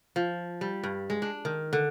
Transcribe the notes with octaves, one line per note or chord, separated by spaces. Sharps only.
F3
G3
G2
G#3
D4
D#3
D3